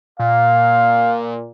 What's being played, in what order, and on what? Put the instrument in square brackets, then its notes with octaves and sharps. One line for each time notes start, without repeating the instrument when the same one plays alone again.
[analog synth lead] A#2 [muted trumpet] F5